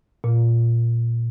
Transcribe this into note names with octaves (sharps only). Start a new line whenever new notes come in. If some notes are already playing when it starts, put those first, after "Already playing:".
A#2